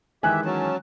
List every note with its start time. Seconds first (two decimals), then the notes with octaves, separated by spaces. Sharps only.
0.23 D#3 E3 G#3 G4 E5 G#5 F#6
0.45 F#3 C#4 A5